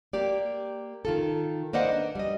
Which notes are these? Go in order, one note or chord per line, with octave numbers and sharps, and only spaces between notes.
A#3 G4 D5
D#3 F4 A4
A#3 B4 C5 D5 D#5 F#5
D4
G3 D#5